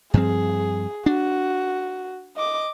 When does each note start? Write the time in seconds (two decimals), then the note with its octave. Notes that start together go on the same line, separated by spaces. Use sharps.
0.14 G2 F3 C4 G#4
1.06 D4 F#4
2.36 D#5 D6